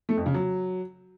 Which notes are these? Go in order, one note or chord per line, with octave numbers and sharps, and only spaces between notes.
A3
F2
C#3
F#3